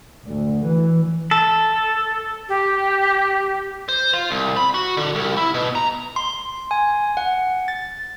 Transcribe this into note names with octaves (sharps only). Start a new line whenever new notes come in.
D2
E3
A4
G4
C5
F4
C2
B5
F#4
D3
C2
E4
B2
A#5
C6
G#5
F#5
A6